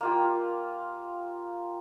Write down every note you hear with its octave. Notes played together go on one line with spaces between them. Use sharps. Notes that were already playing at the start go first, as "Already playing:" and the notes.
A#3 F4 G4